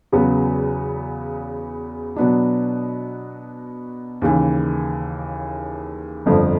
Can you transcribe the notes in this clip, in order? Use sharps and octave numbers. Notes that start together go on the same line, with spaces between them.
E2 C#3 F#3 B3
B2 F#3 B3 D4
D#2 C#3 E3
G1 F2 D3 F3